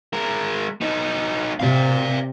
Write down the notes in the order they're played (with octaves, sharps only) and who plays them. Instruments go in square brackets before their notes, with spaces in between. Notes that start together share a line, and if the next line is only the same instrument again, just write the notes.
[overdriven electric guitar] G#3 A#4
B3 D#4
[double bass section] C3 [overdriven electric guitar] D5 F5